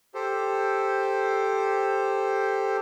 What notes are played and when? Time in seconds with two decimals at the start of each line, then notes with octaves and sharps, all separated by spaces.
0.15 G4 A4 C5